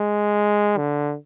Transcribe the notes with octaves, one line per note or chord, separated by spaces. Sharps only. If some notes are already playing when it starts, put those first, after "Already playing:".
Already playing: G#3
D3